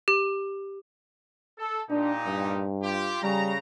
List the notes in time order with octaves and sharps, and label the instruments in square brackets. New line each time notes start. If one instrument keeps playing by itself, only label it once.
[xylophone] G4
[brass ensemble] A4
[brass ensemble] A#2 D#4 G4 [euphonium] D4
[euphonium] G2
[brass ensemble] F4 G4
[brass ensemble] C#3 A#5 [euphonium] G3